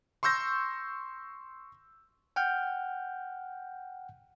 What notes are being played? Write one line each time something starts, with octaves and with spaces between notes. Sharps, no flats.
C6 C#6 E6 G6 A#6
F#5 G5 F6 G6